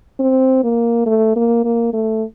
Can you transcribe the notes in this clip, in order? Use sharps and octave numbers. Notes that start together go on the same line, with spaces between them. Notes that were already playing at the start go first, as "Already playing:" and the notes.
C4
A#3
A3
A#3
A#3
A3